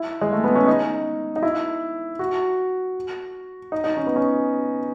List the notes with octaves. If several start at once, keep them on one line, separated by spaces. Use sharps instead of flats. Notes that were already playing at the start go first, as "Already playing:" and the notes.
Already playing: E4
G#3
A3
B3
C#4
D#4
D#4
E4
F#4
D#4
D#4
C#4
B3
C#4